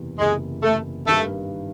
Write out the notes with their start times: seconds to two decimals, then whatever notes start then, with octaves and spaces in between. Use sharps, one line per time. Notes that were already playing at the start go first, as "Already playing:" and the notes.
Already playing: F#1 E2 C3
0.19 F#1 E2 C3 G#3
0.63 A3
1.06 G#1 G2 D#3 G3 A3